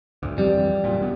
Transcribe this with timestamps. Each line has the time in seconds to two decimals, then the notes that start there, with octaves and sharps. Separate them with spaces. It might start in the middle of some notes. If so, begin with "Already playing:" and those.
0.23 D2 G2
0.38 F2 E3 G3 C4
0.84 F#1 A#2
0.99 E1 B3